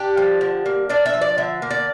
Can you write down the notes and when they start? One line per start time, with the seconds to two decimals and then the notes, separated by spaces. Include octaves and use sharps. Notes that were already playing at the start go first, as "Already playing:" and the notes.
Already playing: D4 G4
0.17 F3
0.41 D3
0.66 A#3
0.89 D4 D5
1.06 E5
1.14 F3
1.22 D5
1.38 D3 E5
1.62 A#3
1.70 D5